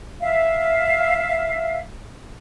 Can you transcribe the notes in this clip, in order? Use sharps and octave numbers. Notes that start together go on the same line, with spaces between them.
E5 F5